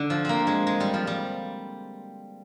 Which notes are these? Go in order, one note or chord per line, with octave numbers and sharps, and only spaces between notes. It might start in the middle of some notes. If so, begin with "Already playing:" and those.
Already playing: D3
F3
A#3 C4
G#3
G#3
G3
F3
G3